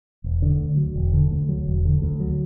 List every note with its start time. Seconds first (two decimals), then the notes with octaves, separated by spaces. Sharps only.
0.24 E1
0.42 D3
0.60 D2
0.77 F#3
0.96 E1
1.13 D3
1.31 D2
1.49 F#3
1.66 E1
1.85 D3
2.02 D2
2.20 F#3